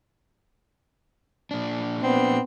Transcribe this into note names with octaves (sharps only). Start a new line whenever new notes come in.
A#2 D4
B3 C4